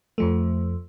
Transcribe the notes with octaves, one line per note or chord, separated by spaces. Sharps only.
F2 F3 A3